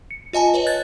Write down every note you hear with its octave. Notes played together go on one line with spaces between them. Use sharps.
C#7
F4 D#5 G#5 A5
B4 C#5 D#5
F#6 G#6 A6